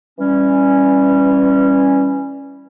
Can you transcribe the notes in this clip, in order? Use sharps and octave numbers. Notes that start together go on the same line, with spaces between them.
E3 G3 C#4